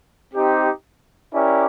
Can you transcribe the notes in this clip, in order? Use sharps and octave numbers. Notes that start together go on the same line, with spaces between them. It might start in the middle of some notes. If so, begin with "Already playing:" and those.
C4 D#4 G4
C#4 E4 G4 A#4 D5